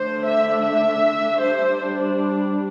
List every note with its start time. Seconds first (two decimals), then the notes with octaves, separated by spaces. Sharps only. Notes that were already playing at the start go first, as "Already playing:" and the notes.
Already playing: D3 A3 D4 C5
0.24 E5
0.63 E5
1.41 G3 D4 C5